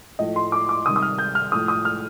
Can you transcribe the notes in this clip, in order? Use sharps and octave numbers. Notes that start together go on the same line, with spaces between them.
A2 F3 A3 D#5
C6
D6
D6
C3 D#3 G3 D#6
D#6
F6
G6
F6
A2 F3 A3 D#6
D#6
F6